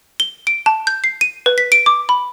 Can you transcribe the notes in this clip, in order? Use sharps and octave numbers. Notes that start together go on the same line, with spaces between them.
G7
D7
A5
G6
C7
D#7
B4
B6
D7
D6
B5